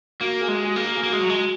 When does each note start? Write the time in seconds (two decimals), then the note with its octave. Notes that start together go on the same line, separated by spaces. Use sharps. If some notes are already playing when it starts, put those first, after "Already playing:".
0.20 A#3 F#4
0.41 G#4
0.48 G#3
0.62 G#4
0.76 A#3
0.84 F#4
0.96 G#4
1.03 A#3 F#4
1.13 G#3
1.21 F#3
1.30 G#3